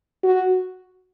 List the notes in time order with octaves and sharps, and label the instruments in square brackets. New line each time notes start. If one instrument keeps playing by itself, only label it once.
[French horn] F#4